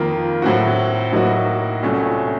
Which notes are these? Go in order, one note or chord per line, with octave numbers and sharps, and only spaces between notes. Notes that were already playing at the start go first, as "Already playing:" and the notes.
Already playing: F2 D#3 A#3 F4
A2 F#3 C4 F#4
A2 F#3 A#3 D#4 F#4
C2 A#2 A3 C#4 F#4